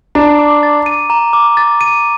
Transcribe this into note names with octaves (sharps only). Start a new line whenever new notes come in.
D4 A#5
D6
A6
D#7
A#5
D6
A6
D#7